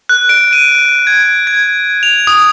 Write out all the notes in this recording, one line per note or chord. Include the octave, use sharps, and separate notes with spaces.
F#6
D7
D#7
G#6
G#6
F7
D#6